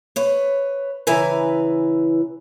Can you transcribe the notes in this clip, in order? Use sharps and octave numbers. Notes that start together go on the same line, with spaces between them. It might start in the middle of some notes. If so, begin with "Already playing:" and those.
B4 C#5
C#3 E3 E4 B4 G#5 A#5